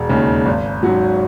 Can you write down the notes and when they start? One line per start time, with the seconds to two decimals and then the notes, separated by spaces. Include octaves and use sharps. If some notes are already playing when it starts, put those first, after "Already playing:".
Already playing: E1
0.09 D#2 C#3 G#3
0.46 G#1
0.83 G#2 F#3 C#4 F#4